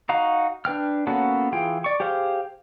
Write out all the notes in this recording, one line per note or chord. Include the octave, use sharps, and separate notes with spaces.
D#4 F#4 F5 A#5
D4 B4 G5 F6
A#3 B3 C#4 F#4 A4
E3 F4 G#4 G5
D5 C#6
G4 G#4 C5 F5